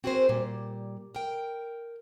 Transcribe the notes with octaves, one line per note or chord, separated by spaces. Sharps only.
C4 F#4 G#4 A#4 C5
A#2 G3
A#4 G5